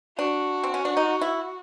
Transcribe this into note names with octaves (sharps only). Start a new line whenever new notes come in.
D4 F#4
C4
C#4
D4
D#4
E4